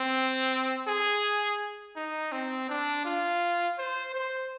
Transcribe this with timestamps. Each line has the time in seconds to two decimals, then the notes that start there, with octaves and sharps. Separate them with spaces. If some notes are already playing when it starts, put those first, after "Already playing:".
Already playing: C4
0.87 G#4
1.96 D#4
2.32 C4
2.69 D4
3.05 F4
3.78 C5
4.14 C5